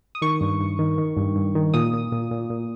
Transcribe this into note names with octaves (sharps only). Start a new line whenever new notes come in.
D#6
D#3 C#6
G2
G2
D#3
D#3
G2
G2
D#3
A#2 D#6
A#2
A#2
A#2
A#2